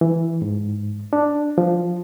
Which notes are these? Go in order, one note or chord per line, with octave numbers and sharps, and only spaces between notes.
E3
G#2
D4
F3